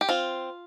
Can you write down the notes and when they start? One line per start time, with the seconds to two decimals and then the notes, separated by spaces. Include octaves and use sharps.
0.01 G4
0.09 C4 F4